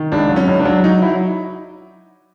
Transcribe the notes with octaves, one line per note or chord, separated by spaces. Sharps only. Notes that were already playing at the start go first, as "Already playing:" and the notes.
Already playing: D#3
C#2 D4
F#3
C#4
C#2
D4
F#3
F#3 D#4
F#3 E4